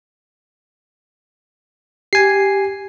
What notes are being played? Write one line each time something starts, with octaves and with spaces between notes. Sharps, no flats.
G4 G#5 C7